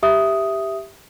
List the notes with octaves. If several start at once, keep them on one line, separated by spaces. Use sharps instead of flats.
G4 E5 D#6